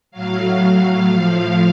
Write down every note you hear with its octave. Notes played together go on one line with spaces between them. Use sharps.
A2 F#3 F5
A2 F3 F5